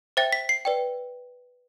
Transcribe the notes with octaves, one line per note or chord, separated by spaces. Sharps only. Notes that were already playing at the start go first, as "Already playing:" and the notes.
C5 E5 G5 A6
B6
C7
B4 D5 G5